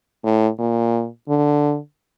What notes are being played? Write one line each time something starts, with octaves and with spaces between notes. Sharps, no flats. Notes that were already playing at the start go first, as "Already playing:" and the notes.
A2
A#2
D3